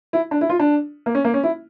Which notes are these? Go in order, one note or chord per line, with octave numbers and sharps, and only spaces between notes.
E4
D4
E4
F4
D4
A#3
C#4
A#3
C#4
E4